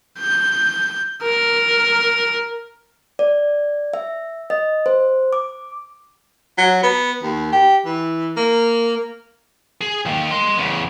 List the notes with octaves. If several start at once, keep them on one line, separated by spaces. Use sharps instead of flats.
G6
A#4
D5
E5
D#5
C5
D6
F#3
B3
D#2
G4
E3
A#3
G#4
D#3 A#3
D#5 C6
E2 C#3